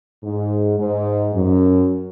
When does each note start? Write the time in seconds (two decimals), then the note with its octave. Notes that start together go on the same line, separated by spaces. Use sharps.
0.24 G#2
0.79 G#2
1.34 F#2